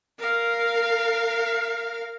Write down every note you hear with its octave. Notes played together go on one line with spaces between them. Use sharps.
A#4 F5